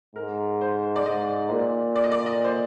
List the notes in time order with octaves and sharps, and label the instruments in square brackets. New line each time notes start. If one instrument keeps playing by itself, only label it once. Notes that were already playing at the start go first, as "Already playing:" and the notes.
[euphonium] G#2 [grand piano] A#4
[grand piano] C5
D5
[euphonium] G#2 [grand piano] D#5
[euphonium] A#2
[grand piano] D5
D#5
D5
D#5
C5